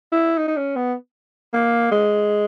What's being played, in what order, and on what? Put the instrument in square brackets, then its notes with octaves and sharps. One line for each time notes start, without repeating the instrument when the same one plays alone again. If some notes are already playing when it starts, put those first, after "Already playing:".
[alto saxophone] E4
D#4
D#4
C#4
B3
A#3
G#3